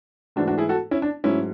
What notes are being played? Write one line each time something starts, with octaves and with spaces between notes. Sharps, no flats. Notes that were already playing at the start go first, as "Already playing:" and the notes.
G#2 E3 A3 D4 F#4
D4 F#4
E4 G#4
F#4 A4
C#4 E4
D4
G#2 F#3 A3 C#4 E4